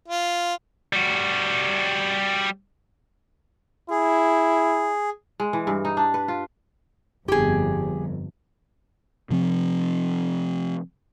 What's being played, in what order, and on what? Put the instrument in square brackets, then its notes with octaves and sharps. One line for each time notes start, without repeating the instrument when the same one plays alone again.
[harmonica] F4
[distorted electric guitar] G3 F#4
[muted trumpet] E4 [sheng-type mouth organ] G#4
[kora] G#3
E3
G2
D#4
D4
B4
F4
[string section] G1 F2 [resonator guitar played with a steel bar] G4 G#4
[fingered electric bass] C3 F3 C4